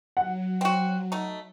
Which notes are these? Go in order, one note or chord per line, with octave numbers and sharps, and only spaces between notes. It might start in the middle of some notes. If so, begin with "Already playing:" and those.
F#3 F#5
C4 F#4
A3 D#4